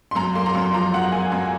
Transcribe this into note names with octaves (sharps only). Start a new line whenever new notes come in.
C6
F#2 A#5
A#3 C6
A#5
F#2 C6
F3 A#5
F#2 F#5
A#3 G#5
F#2 G#5